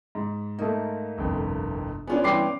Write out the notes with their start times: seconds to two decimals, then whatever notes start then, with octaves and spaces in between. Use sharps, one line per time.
0.15 G#2
0.59 A3 A#3 D#4
1.18 G1 C2 F2
2.07 B3 C#4 D4 F4 G#4 C#5
2.24 G2 E3 G5 C6 D6 C7